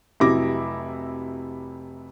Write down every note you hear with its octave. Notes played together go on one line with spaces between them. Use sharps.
F1 C3 F#3 E4 D6 A#6